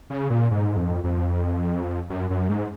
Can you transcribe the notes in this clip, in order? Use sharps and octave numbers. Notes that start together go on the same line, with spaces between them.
C#3
A#2
G#2
F2
F2
F#2
F#2
G#2